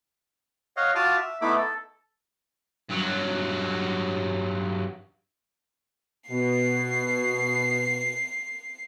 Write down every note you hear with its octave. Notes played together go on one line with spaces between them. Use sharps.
C#5 D#5 F5 F#5
F4 F#4 A5 D6 D#6 F6
E5
A3 B3 D#4 E4 B5 D6
A4
G2 F#3
B2 C7